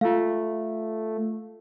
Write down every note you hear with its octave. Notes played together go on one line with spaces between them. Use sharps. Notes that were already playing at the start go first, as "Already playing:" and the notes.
A3 F4 F5